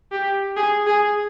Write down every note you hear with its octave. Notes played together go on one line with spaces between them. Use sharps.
G4
G#4
G#4